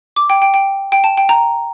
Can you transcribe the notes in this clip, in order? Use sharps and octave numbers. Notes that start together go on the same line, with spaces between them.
D6
G5
G5
G5
G5
A5
G5
A#5